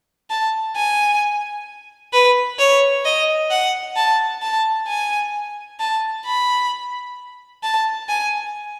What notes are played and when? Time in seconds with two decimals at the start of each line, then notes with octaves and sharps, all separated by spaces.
0.30 A5
0.76 G#5
2.13 B4
2.59 C#5
3.05 D#5
3.51 F#5
3.96 A5
4.42 A5
4.88 G#5
5.80 A5
6.26 B5
7.63 A5
8.09 G#5